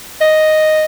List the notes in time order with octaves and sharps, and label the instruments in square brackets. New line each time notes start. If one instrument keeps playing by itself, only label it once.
[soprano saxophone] D#5